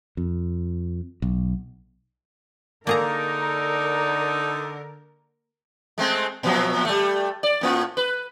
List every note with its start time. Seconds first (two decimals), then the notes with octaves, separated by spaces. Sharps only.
0.17 F2
1.22 B1
2.87 D3 A#3 D#4 G#4 A#4 A#5
5.98 G#3 A3 C4
6.43 A#2 F3 F#3
6.85 G3 A3
7.43 D5
7.61 A2 A#3 F4
7.97 B4